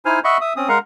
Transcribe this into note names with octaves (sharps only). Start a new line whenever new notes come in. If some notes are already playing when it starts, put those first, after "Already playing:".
D#4 E4 C5 G#5 F6
D#5 E5 F#5 B5 C#6
E5 D#6
C4 C#4 D#6
G#3 A#4 F5 F#5 A#5